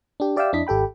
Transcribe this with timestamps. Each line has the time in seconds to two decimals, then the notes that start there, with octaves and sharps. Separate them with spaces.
0.20 D4 G4
0.36 G4 D5 E5 F5 G5 E6
0.53 F2 D4 E4 D#5 B6
0.67 G#1 G4 A4 G5 B5